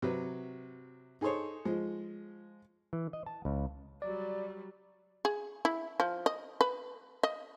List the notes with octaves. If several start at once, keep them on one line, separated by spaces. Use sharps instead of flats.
C3 F#3 B4
D#4 G#4 A4 C5 C#5
F3 G#3
E3
D#5
A5
C#2
F#3 G3 D5
G#4
E4
F3
D#5
B4
D#5